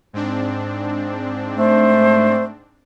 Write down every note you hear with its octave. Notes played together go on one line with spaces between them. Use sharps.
G#2 C4 D4
A3 C5